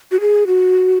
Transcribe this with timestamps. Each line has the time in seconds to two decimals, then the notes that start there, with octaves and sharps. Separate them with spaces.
0.12 F#4
0.21 G#4
0.47 F#4